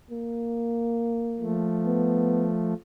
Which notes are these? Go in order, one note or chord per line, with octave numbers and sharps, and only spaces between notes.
A#3
F3 A3
B3